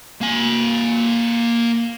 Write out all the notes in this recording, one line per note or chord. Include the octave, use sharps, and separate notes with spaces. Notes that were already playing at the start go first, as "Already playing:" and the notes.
A#3 G#5